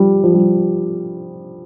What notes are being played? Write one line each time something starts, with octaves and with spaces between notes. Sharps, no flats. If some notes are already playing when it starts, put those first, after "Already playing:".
Already playing: F3 G3
F3
G3